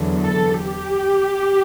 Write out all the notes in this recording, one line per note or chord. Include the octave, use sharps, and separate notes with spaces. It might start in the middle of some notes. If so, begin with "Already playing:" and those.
Already playing: E2 D3 F#3
A4
G4